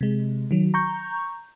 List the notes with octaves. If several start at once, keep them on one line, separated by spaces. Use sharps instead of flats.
C3 G#3
D#3 F#3
A#5 C#6 G6